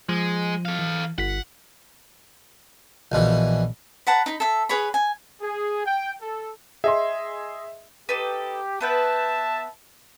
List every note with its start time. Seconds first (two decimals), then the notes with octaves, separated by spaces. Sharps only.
0.09 F3 G#3
0.65 A4 F5
0.79 E3
1.18 G1 F#5 B6
3.12 A#1 B2 E3
4.07 B4 F#5 A5 A#5
4.26 D#4 B5
4.40 A4 E5
4.69 G#4 B4 C#5 B5
4.94 G#5
5.42 G#4
5.85 G5
6.21 A4
6.84 G#4 D#5 E5 C6
8.09 D#4 G4 A4 B4
8.80 B3 B4 E5 G5 A5